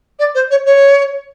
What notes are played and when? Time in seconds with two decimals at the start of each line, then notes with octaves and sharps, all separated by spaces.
0.19 D5
0.35 C5
0.50 C#5
0.65 C#5